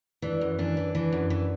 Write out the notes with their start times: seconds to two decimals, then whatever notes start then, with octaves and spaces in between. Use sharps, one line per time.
0.22 E3 D4
0.41 F#2
0.59 E3 D4
0.77 E3
0.95 E3
1.12 F#2
1.30 E3